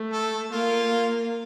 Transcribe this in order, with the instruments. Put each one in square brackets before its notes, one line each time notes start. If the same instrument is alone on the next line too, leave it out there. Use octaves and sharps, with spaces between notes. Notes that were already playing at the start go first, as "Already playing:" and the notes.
Already playing: [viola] A3
[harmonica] A4
[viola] A#3 [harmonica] F4